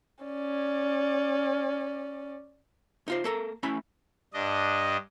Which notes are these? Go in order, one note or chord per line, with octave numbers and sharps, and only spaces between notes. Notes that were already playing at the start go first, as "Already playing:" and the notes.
C#4 D5
D#4 F4 C5
A#3 A4 A#4
A3 C#4 E4 B5
G2 D4 D#5